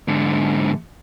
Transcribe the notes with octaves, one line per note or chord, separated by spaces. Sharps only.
G#2 D3